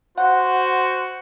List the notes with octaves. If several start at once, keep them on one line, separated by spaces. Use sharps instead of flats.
F#4 C5 F#5